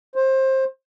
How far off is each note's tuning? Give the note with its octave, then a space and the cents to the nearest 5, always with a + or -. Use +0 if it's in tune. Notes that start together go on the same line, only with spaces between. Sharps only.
C5 +20